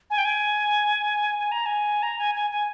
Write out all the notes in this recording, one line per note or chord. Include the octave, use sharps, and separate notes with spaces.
G#5
G5
G#5
G#5
A#5
G#5
A#5
G#5
G#5
G#5